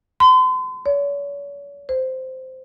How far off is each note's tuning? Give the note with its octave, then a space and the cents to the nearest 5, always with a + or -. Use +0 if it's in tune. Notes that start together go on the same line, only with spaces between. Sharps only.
C6 -40
C#5 +40
C5 -10